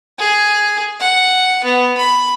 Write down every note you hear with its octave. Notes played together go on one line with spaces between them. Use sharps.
G#4
F#5
B3
B5